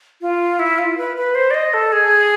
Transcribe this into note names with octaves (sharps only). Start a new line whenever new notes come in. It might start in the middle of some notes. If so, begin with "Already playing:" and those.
F4
E4
F4
B4
B4
C5
D5
D#5
A4
G#4